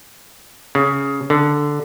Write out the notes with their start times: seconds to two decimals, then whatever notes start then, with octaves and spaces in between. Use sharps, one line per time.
0.75 C#3
1.30 D3